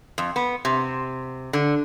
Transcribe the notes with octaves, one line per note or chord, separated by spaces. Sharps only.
F2
B3
C3
D3